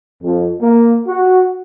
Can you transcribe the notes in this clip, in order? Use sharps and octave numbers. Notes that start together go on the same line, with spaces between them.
F2
A#3
F#4